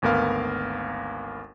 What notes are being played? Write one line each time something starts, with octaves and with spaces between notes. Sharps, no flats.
G#1 D2 B3 A#4 F5